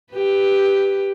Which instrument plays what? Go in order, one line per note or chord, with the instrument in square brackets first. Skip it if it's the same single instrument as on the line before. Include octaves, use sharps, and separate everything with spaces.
[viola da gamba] G4 B4